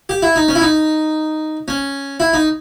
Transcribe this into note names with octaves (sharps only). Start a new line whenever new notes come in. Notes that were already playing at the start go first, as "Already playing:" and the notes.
G4
E4
D#4
C#4
E4
D#4
C#4
E4
D#4